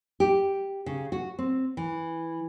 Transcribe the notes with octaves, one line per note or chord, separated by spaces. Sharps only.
G4
C#3
F#4
C4
E3